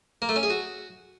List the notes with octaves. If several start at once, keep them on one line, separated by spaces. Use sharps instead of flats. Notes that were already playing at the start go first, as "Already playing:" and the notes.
A#3
A3
C#4
G#4
F#4